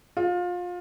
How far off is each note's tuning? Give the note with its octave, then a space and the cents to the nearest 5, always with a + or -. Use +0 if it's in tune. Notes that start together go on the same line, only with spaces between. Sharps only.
F4 +25